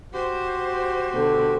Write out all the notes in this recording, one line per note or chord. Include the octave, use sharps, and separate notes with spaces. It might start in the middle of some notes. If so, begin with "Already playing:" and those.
F#4 G4 C5
B2 D3